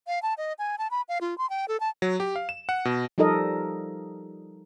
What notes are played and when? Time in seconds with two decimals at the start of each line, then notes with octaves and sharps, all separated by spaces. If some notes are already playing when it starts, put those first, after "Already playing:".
0.07 F5
0.22 A5
0.38 D#5
0.59 G#5
0.78 A5
0.91 B5
1.08 F5
1.21 F4
1.38 C6
1.50 G5
1.68 A4
1.80 A5
2.02 F#3
2.20 G4
2.36 F5
2.49 E7
2.69 F#5
2.85 B2
3.18 F3 G3 D#4 A4 A#4 D#5